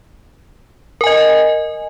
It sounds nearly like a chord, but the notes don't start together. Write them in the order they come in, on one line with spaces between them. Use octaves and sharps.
A#4 G#5 D#5